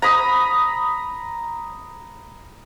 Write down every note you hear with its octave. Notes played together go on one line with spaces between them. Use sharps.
A#5 B5 D#6